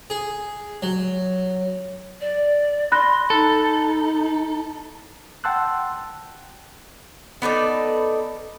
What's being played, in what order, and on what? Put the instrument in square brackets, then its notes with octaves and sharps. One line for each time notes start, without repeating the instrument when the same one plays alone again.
[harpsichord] G#4
F#3
[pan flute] D5
[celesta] B5 F#6 A#6 [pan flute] C6
[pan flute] D#4 [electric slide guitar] A4
[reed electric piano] F#5 G5 A5 C6 E6 F#6
[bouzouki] B3 D#4 A4 D5